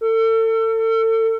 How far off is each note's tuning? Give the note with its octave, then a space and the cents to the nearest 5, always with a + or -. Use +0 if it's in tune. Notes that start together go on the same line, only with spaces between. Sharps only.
A4 +35